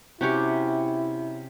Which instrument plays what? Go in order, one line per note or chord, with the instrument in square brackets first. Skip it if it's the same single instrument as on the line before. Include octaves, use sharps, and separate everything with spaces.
[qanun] C3 C#4 D6 [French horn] E4 [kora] F#4 G4 C#5